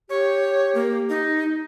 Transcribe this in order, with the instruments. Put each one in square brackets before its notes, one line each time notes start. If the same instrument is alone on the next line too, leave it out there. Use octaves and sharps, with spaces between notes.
[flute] G4 [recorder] C#5
[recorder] A#3
D#4